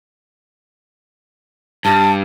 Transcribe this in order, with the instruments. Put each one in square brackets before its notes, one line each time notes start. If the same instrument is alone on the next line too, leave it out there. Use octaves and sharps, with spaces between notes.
[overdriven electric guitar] G2 [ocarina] A5